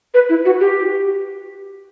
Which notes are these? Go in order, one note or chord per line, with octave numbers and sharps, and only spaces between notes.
B4
E4
F#4
G4